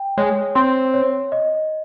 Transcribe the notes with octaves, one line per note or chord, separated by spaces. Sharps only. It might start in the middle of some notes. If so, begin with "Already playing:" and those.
Already playing: G5
G#3 C#5
C4 C6
C#5
D#5